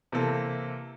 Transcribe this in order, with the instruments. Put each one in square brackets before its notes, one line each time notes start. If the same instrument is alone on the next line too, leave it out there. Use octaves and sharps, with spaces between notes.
[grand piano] C3 E3 A#3 A4